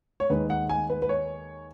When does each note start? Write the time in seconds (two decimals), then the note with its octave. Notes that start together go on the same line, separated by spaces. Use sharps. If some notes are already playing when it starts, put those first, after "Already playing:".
0.20 C#5
0.30 D#2 D#3 G#3 B4
0.50 F#5
0.69 G#5
0.90 B4
1.02 B4
1.09 C#5